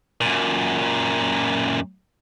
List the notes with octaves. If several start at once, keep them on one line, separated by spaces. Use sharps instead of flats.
F#2 A#2